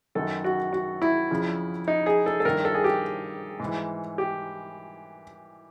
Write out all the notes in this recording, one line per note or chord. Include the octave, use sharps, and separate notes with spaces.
F#2 D#3 A4
F#4
F#4
E4
F2 C#3 F3
D#4
G#4
A4
A4
G2 D#3 A#4
A4
G#4
G4
G#2
E3
G4